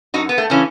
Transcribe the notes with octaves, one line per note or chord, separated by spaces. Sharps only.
F#2 D#4 F#4
B3
A3
C#3 E3 C#4